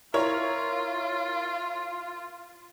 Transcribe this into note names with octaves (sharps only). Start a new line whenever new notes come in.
E4 F4 A#4 C#5